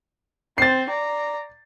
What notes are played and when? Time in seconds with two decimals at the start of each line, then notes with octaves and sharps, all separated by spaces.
0.58 C4 C5 A6 C7
0.89 D5 A#5